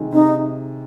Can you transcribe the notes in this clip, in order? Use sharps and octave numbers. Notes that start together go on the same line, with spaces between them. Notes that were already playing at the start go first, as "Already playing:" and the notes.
Already playing: C3 D#3 G#3
C3 D#4